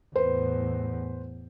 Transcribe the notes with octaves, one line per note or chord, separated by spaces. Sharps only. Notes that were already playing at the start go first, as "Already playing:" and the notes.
E2 A2 B4 C5